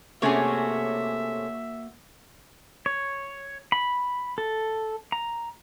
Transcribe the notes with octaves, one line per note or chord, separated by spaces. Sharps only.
C3 A3 A#3 C#4 F#4 G#4 C#5 E5
C#5
B5
A4
A#5